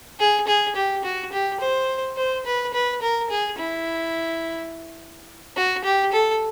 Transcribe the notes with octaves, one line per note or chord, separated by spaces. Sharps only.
G#4
G#4
G4
F#4
G4
C5
C5
B4
B4
A#4
G#4
E4
F#4
G4
A4